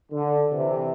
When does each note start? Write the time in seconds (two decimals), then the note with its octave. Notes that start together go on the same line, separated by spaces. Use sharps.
0.12 D3
0.52 C3 E3